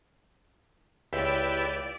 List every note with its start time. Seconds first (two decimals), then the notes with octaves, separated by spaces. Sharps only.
1.13 C#2 E4 G4 B4 D5